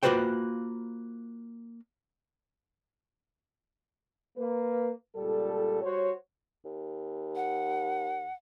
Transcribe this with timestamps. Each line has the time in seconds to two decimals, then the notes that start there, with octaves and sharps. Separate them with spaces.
0.03 A#3 F4 F#4 B4 C5 G5
4.37 A#3 B4
5.16 C#2 A#2 G3 A4
5.82 G3 F#4 C5 C#5
6.65 D#2
7.36 F#5